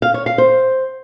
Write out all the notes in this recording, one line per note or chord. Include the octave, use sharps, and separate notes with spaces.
F5
C#5
F5
C5